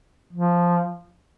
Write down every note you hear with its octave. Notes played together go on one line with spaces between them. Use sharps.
F3